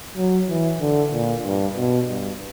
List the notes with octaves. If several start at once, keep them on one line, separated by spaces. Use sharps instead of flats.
F#3
E3
D3
A#2
G2
B2
G2